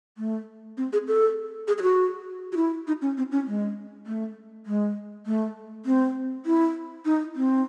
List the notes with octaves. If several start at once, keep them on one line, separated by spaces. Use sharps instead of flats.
A3
C4
G#4
A4
G#4
G#4
F#4
F#4
E4
D#4
C#4
C4
C#4
G#3
A3
G#3
A3
C4
E4
D#4
C4